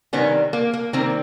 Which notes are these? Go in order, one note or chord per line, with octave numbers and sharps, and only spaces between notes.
C3 D#3 G3 B3 C#4
A#3
A#3
C3 D#3 G3 A#3 C4